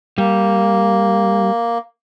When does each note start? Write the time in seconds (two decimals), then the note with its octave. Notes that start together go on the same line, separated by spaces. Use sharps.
0.18 G3 A#3